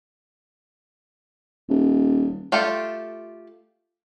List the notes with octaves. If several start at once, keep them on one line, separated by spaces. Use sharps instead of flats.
D#1
A3 F4 G4 A4